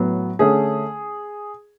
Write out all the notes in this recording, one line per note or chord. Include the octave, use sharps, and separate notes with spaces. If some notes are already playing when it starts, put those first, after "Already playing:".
Already playing: A2 F#3 B3
D3 A3 C#4 G#4